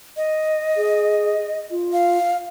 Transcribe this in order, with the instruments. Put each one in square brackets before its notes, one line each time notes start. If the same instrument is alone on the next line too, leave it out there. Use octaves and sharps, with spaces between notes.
[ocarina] D#5
[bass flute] G#4
F4
[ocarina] F5